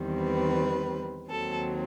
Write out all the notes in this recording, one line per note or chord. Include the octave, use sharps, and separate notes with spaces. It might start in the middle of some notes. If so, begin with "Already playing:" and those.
Already playing: E2 D#3 G3 C4
B4
D#2 D#3 F#3 C4 A4